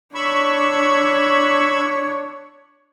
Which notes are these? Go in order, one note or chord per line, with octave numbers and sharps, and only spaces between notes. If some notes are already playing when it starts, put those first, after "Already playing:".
D4 C#5 B5 C#6 E6